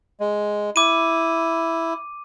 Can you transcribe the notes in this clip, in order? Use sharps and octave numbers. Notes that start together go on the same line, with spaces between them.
G#3
E4 D6 D#7